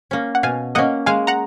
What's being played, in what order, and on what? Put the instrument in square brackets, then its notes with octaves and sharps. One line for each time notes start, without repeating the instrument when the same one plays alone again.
[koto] A#3 C#4
[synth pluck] F#5
[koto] B2 [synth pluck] F5 G#5
[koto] A#3 C#4 [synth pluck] D#5 F#5
[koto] G#3 [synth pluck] F5 G#5
[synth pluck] F#5 A#5